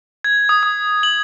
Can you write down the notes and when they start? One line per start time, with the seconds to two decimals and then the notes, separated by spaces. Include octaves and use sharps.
0.24 G#6
0.49 D#6
0.63 D#6
1.03 F#7